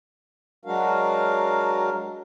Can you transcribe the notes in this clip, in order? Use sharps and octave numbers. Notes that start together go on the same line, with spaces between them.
F#3 G#3 D4 F#4 A#4 F5